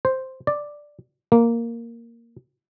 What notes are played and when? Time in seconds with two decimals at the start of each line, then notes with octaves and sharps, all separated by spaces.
0.05 C5
0.47 D5
1.32 A#3